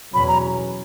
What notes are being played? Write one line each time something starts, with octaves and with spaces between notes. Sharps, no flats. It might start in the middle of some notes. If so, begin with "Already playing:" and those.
E2 B2 F#3 C#4 B5
A#5